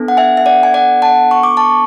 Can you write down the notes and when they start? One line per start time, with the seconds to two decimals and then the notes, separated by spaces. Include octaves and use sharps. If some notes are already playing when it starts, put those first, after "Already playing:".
Already playing: B3 D4 A4
0.08 F#5
0.17 E5 G#5
0.37 E5
0.46 D5 F#5
0.63 G#5
0.74 D5 F#5
1.02 F#5 A5
1.31 C#6
1.43 D6
1.57 A5 C#6